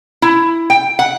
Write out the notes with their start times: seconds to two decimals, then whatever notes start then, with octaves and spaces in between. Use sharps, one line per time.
0.22 E4
0.70 G5
0.99 F#5